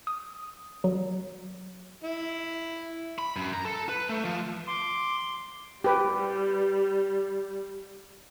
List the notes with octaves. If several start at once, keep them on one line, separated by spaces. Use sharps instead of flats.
D#6
F#3
E4
B5
F#2
A#5
A4
B4
A3
F3
C6 D6
G3 G4 B4